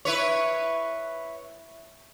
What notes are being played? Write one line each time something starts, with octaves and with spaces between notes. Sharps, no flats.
E4 B4 C#5